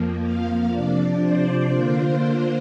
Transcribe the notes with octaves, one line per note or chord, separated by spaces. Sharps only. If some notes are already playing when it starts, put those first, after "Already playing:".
Already playing: F2 F3 A#3
F5
C3 F3 D4 D5
C5
D3 A#3 D4 F4